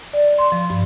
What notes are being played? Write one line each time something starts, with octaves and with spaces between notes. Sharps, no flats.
D5
C6
F3
G2